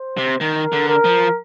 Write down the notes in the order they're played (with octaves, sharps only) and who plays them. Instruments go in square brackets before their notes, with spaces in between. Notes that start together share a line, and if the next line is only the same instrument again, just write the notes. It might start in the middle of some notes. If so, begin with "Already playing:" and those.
Already playing: [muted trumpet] C5
[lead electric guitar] C3
[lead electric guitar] D#3 [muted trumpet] A#4
[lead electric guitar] D3
[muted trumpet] A#4
[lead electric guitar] F3